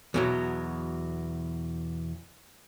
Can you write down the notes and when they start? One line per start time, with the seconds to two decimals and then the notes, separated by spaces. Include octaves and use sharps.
0.14 E2 B2 F#3